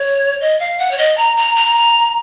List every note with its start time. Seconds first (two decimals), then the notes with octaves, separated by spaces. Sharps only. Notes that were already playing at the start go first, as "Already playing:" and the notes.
Already playing: C#5
0.41 D#5
0.60 F5
0.79 F#5
0.91 C#5
0.98 D#5
1.18 A#5
1.37 A#5
1.56 A#5